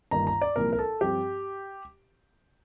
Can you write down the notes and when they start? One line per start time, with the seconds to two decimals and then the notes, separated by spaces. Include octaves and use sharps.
0.11 G1 G2 D#3 A#3 A#5
0.27 A#5
0.42 D5
0.56 C2 A#2 F3 A#4
0.73 A#4
0.79 A4
1.01 G2 F3 C4 G4